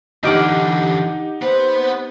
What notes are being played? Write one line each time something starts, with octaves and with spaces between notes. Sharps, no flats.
D3 E3 D#4 G4 F#5 D6 F6
B3 B4 C5